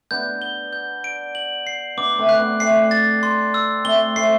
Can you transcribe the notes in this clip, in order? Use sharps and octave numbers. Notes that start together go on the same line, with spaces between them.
B3 D4 G6
G7
G6
D7
F#7
C7
B3 D4 D6
A3 C4
F#6
B3 D4
A3 C4 C7
A6
C6
E6
A3 C4 G7
A3 C4 C7